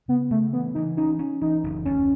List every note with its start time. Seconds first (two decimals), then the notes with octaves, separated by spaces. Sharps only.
0.08 C#3 B3
0.31 C#3 A3
0.53 E3 B3
0.75 E3 D#4
0.97 C#4 D#4
1.19 C#4
1.42 E3 D#4
1.64 F#1
1.85 D#2 C#4